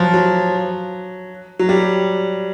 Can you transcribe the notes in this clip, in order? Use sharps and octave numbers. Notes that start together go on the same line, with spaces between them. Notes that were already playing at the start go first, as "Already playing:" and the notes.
Already playing: F3 F#3
F#3
F#3
G3